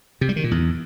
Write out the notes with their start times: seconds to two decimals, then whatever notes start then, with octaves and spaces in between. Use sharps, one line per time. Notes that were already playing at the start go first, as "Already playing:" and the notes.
0.21 C3
0.29 G3
0.36 D#3
0.44 A#2
0.51 E2